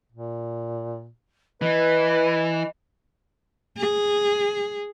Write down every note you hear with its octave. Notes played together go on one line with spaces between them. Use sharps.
A#2
E3 B4 D#5
G#4